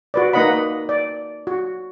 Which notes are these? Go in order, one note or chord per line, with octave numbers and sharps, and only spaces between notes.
F#4 B4 D5
A#3 D#4 B4 D#5 F#5 B5
D5
F#4